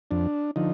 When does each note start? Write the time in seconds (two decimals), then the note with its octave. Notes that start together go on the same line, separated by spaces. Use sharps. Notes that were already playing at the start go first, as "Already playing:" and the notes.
0.11 F2 D4
0.56 D3 F3 D#4